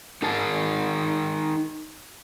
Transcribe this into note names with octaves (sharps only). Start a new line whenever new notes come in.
D#4 G#4 A#4 A5